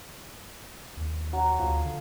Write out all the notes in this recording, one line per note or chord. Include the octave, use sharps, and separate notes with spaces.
D#2
F#3 F#4
D2 F3 G#4
D3